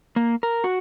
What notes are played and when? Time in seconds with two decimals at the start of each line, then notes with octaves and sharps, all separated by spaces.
0.16 A#3
0.43 A#4
0.64 F#4